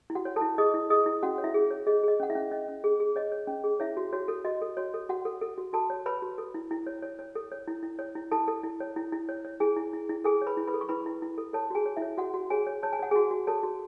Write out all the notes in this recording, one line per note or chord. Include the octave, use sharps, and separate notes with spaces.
E4
F#4 F#5
C#5
A4 A5
E4
G#4 D#5 D#6
E4
G#4 D#5 D#6
E4
C#4 F#4 F#5
C#5
E4 E5
G#4
C#5
G#4 D#5
G#4 D#5
C#4 F#5
E4 E5
C#4
C#4 D#5
C#4
G#4
G#4
C#5 D#5
C#5
C#4
G#4
E4 C#5 E5
F#4
F#4 C#5
A4
F#4 D#5
A4
F#4 C#5
A4
F#4 F#5
A4
A4
F#4
F#4 A4 A5
C#5
B4 C#5 B5
F#4
A4
E4
E4
C#5
C#5
C#5
A4
C#5
E4
E4
C#5
E4
E4 A4 A5
A4
E4
C#5
E4
E4
C#5
C#5
E4 G#4 G#5
E4
E4
E4
G#4 A4 G#5
C#5
B4 B5
E4
B4 B5
A4
C#6
E4 B4 B5
E4
E4
A4
A4 C#5 A5
F#4 G#4 G#5
C#5
E4 E5
C#5
F#4 F#5
F#4
G#4 C#5 G#5
C#5
C#5 A5
G#5
C#5 F#5
F#4 G#4 G#5
F#4
A4 C#5 A5
F#4